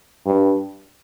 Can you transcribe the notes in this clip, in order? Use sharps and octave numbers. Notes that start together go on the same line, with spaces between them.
G2